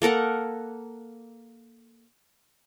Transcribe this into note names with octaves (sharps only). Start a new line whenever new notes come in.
A#3 A4 A#4 F#5